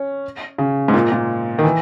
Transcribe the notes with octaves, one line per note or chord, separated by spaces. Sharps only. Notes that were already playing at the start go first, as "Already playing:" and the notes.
Already playing: C#4
C#3
G#2
A#2
A#2
D#3
E3